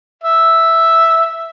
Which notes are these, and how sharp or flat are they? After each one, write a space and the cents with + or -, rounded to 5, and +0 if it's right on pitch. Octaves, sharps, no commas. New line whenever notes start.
E5 +0